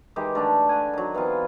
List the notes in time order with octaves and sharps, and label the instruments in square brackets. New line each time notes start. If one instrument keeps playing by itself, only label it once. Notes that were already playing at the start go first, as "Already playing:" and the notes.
[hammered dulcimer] D#3 E3 G#3 G4
D3 A3 D4
F#5 G#5
D#3 F#3
E3 B3 C4 F4